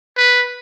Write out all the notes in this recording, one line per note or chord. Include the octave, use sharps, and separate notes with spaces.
B4